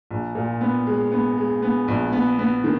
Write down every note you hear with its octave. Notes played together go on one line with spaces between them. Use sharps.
A#1
A#2
B3
G#3
B3
G#3
B3
A#1
B3
B3
D#3